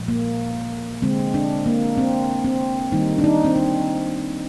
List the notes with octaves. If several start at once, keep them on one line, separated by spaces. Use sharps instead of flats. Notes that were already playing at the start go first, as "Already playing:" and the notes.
Already playing: A#2 F3 G#3
A#3
D3 G#3 C4
D4
A#3
C4
C4
D#3 G3 A#3 D#4
D4
D#4
C4
D4